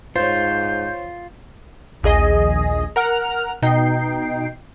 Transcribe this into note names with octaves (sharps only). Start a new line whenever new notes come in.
G#2 F4 C5 C#5 G6
A#1 D#2 G#4 D#5
A#4 F#5 F6
B2 D#4 G5 C7